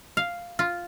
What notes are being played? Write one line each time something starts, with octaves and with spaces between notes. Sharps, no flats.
F5
F4